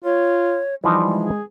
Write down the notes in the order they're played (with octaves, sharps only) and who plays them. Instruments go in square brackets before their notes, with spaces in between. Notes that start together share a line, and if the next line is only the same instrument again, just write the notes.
[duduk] F4 [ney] C#5
[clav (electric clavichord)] E3 F3 D#4 [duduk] G3 [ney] D#5
[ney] G#3
[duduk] G#4